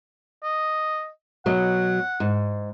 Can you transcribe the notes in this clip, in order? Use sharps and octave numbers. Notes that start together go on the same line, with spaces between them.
D#5
B2 F#3 D#5 F#5
G#2